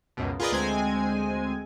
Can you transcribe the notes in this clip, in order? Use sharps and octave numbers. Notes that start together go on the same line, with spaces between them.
C#2 F#2 B2
F4 G#4 A#4 B4 D5 D#5
D2 G#3 C4 G#5